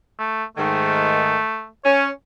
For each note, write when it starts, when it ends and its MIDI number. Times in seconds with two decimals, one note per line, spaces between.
0.19 0.44 57
0.57 1.38 44
0.57 1.38 51
0.57 1.67 57
1.85 2.08 61
1.85 2.08 73